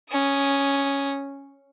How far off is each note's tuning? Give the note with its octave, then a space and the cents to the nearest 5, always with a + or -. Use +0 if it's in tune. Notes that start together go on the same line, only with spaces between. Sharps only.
C#4 +0 D#6 +0